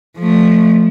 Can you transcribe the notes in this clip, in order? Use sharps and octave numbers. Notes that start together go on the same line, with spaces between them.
F3 A3